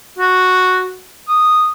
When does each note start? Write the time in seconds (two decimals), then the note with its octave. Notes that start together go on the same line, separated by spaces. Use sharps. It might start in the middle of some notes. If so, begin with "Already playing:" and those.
0.18 F#4
1.28 D#6